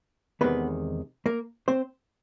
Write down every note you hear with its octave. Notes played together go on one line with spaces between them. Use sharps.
E2 C3 D#3 G#3 B3 B4
A#3 A#4
C4 C5